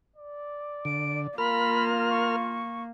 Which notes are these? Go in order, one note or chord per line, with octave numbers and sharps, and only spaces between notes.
D5
D3 D7
A#3 F4 A#4 B5 F6
C#6